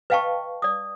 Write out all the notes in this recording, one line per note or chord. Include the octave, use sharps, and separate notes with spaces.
B4 D#5 F5 G5 A5 C#6
D5 D#6